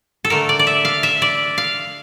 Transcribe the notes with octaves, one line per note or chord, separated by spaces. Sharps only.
A4
D3 A3 A#4
D5
D5
E5
F5
E5
D5
F5